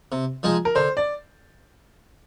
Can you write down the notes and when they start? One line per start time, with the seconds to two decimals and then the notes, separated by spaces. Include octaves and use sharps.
0.12 C3
0.43 F3 G#3 D#4 G#4
0.65 A#4
0.75 D3 C5
0.97 D5